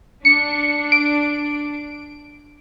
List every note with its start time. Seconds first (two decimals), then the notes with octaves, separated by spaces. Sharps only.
0.25 D4 C#7
0.92 D7